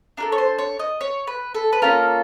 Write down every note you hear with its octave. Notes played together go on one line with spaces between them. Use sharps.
D4 F#4 A4 A#4
C#5
C5
C#5
D#5
C#5
B4
A4
B4
A#3 C#4 F4 A4 A#4